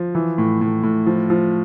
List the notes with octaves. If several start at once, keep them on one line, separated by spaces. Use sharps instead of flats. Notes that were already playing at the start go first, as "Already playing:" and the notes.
Already playing: F3
E3
A2
A2
A2
F3
F3